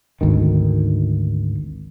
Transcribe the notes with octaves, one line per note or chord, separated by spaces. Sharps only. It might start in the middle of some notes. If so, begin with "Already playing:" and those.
G#1 D2 D#3